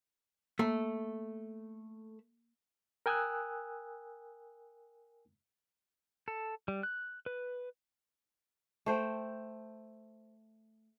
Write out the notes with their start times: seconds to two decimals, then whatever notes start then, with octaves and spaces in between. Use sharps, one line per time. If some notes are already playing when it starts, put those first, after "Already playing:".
0.59 A3 A#3
3.06 A#4 G5 G#5 D#6 E6 F#6
6.28 A4
6.68 G3
6.83 F#6
7.26 B4
8.86 A3 C5 G5